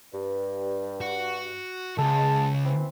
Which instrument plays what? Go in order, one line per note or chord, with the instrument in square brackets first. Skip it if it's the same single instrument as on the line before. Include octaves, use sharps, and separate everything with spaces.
[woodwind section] G2
[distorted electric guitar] F#4
[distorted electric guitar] C#2 [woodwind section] G#3 A5
[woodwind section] E3 C4